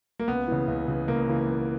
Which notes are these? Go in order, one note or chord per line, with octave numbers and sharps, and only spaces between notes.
A#3
C#2 B3
C#3 E3
C#2
C#3 E3
C#2 A#3
C#3 E3
C#2